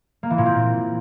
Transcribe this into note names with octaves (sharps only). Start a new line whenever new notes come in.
A#3
E3
A#2
C4